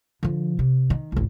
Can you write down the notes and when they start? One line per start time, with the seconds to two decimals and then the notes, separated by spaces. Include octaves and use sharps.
0.23 D3 F3
0.59 C3
0.90 D#3
1.12 G#1 C#2